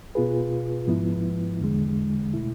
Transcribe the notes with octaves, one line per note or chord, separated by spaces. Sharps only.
B2 B3 F4 G#4 B4
G#2 F3 B3 E4
E2 D3 G#3
B2 A3 E4